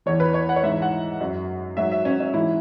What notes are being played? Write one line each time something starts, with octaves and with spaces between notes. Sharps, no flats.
E2 E3 C#5
B4
C#5
F#5
C#5
G#2 E3 E5
F#5
F#2 F#3
G#2 F#3 E5
E5
C#4
C#4
G#2 E3 E4